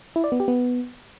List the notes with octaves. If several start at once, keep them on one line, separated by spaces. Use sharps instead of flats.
E4
D5
B3
G4
B3